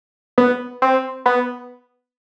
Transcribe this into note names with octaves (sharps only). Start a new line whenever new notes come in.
B3
C4
B3